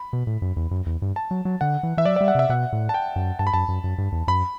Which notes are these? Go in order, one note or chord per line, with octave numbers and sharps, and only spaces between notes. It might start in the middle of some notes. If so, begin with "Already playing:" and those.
Already playing: B5
B2
A2
F#2
E2
F#2
E2
G2
A5
F#3
F#3
D3 F#5
E3
E3 E5
F#3 D5
D5
G3
F#5
C3 E5
B2 F#5
A2
A5
G5
F#2
G2 A5
B5
F#2 A5
F#2
F#2
G2
E2
F#2 B5